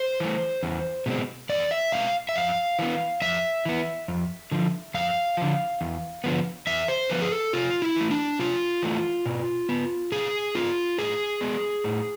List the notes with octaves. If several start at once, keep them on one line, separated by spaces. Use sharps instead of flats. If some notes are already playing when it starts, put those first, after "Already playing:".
Already playing: C5
E3 A3
E2
B2 G#3 C4
E2 D5
E5
B2 G#3 C4 F5
E5
F2 F5
E3 B3
F2 E5
E3 B3
F2
D3 F3
F2 F5
D3 F3
E2
D3 F3 B3
E2 E5
C5
D3 F3 B3 B4
G#4
A4
C3 F4
E4
E3 A3
D4
C3 F4
E3 A3
B2
B3
B2 G#4
B3 F4
A2 G#4
G#3 B3
A2